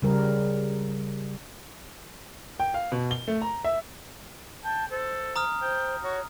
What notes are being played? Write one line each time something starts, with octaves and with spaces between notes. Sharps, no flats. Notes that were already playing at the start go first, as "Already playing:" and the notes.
C#3 G3 A#4
G5
F5
B2
G7
A3
A#5
E5
G5 A5
A4 C5
A#5 D#6 F6
C5 G5
F#4 C#5